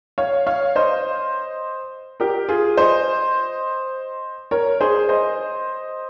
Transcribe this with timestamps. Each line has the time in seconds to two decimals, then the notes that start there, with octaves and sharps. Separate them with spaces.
0.18 C#5 F5
0.47 C#5 F5
0.76 C5 D#5
2.20 G4 A#4
2.49 F4 G#4
2.77 C5 D#5
4.51 A#4 C#5
4.81 G#4 C5
5.09 C5 D#5